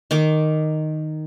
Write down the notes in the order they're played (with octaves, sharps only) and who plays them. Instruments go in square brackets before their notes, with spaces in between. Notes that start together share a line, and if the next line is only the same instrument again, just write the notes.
[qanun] D#3 D6